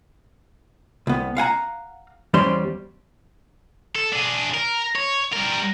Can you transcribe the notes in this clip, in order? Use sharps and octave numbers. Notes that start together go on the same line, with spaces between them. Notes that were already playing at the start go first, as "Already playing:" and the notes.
C2 B3
F5 F#5 G#5 A#5
E2 G3 C#4 C5 D5 C6
A4
D4 G#4
A#4
C#5
G3 A#4